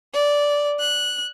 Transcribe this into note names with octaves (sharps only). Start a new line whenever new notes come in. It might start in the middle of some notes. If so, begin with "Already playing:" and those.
D5
F#6